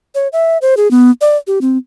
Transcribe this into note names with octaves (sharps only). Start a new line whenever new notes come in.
C#5
E5
C5
G#4
B3
D5
G4
C4